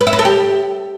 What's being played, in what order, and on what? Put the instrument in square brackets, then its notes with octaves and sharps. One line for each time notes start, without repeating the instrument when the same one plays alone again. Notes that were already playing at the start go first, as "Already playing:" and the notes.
[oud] B4
E5
B4
A4
G4